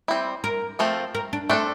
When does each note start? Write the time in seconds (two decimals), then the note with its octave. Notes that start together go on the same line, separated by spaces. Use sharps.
0.08 G3 C4 E4
0.44 A#4
0.79 F3 A3 C4 F4 A4
1.15 A#4
1.33 D4
1.50 A3 C4 D4 A4